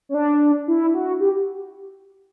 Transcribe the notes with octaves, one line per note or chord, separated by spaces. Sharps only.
C#4
D4
E4
F#4
G4